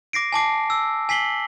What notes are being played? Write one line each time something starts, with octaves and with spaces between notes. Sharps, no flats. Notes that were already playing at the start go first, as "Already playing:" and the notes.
D6 A#6 C7 D7
G#5 A5 D6 C7
E6
G#5 B6 C7 F#7 G7